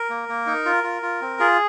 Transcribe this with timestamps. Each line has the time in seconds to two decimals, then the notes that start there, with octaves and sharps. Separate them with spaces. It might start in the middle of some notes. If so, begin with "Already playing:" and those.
Already playing: A#4
0.10 A#3
0.29 A#3
0.47 D#4
0.65 F4
0.84 F4
1.02 F4
1.21 C4
1.39 F4 G#4